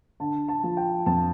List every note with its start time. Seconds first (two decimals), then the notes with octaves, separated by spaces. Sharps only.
0.20 D3 A5
0.48 A5
0.64 F3
0.77 G5
1.06 F2 A5